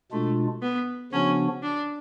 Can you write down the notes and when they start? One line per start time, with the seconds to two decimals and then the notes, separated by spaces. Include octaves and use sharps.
0.12 B2 G#3 A3 D4 F4
0.62 B3
1.12 C#3 F3 B3 C#4 D4 F#4
1.63 D4